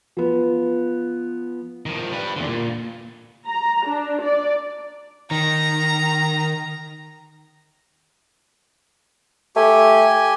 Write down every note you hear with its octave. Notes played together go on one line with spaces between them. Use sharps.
F3 B3
D#3 F3
G3 B4
E2 D3
A#2
A#5
D4
D5
D#3 A#5
A3 G4 G#5